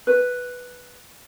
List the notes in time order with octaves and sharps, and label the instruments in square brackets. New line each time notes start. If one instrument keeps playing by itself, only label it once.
[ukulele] B4